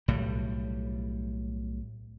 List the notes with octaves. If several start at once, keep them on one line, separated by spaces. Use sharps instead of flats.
B1 A2 G3